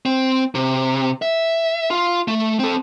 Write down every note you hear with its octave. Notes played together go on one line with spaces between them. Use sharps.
C4
C3
E5
F4
A3
C4 A4